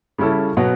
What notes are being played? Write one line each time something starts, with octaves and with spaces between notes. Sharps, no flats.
C#3 G3 C#4 E4 A4
B2 F#3 B3